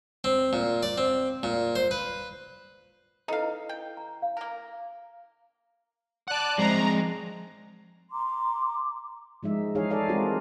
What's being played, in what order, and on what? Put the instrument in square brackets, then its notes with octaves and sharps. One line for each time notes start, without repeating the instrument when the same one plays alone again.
[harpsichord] C4
A#2
D5
C4
A#2
C5
B4
[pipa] D#4 F5 [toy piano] E4 A4 B4
[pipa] G5
[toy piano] A#5
F5
[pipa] A#3 A#4
[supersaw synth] D5 F#6 [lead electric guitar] F#5 A5
[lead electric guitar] F3 G#4 [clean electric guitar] G#3 C4 [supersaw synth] A#5
[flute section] A#5 C6 D6
[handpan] F3 G#3 D#4 E5
E3 D#4 G#4 C#5 F5
G#4 A4 D5 F5
G3 G#3 C4 F4 F#4 A#4